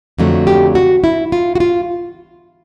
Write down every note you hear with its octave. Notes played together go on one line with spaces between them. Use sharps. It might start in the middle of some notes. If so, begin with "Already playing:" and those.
F2 D3 F#3 A3
G4
F#4
E4
F4
F#4
F4